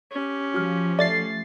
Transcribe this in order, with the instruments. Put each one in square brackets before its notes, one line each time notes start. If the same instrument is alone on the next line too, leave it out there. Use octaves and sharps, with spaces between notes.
[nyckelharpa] C#4 G4
[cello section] F3 [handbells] F#4 F6
[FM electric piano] A3 A6 C7 [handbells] D5